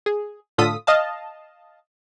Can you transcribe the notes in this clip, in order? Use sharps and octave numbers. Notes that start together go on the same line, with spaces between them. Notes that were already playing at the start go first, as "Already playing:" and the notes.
G#4
A2 D3 F4 A4 D#6 B6
D#5 F5 A5